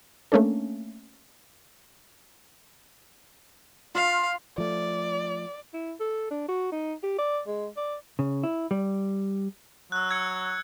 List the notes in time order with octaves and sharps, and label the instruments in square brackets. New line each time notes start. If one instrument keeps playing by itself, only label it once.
[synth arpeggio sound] A3 A#3 C#4 D4 A4
[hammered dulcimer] F4 [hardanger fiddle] F5
[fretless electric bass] F3 A3 [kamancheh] D5
[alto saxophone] E4
A4
D4
F#4
D#4
G4
D5
G#3
D5
[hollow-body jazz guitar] C#3
E4
G3
[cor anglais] F#3 [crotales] E6 F#6
[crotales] E6 G#6 C#7